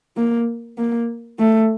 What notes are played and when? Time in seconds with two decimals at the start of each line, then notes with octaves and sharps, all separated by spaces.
0.17 A#3
0.78 A#3
1.39 A3